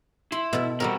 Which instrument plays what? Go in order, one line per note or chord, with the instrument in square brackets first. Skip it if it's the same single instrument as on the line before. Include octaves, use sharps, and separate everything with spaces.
[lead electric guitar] E4 [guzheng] C6
[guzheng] B2 A4
[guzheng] G3 A4 A#4 [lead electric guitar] C4 F#4